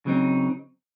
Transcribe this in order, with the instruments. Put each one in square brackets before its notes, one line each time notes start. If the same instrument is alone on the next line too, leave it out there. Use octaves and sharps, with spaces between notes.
[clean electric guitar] C#3 F#3 C4 D#4